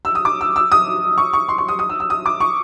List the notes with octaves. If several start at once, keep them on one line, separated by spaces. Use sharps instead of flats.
E6
D#6
D6
E6
E6
D#6
C#6
C#6
C6
C#6
D#6
D#6
E6
E6
D#6
D6
C#6